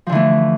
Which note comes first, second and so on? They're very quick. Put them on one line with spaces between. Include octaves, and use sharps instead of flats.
F3 D3 E3 A3